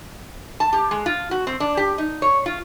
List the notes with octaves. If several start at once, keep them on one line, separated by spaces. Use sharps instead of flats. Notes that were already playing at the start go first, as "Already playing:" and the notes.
A5
G4
G#3
F4
F#4
C4
D4
G4
D#4
C#5
F4